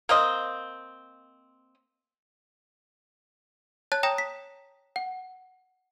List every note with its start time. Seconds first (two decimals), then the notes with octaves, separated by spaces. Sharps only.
0.09 A#3 C4 D#5
3.92 C#5 A5 F#6 A6
4.03 C#5 G5 A#5 D#6 A#6 E7
4.18 B6
4.96 F#5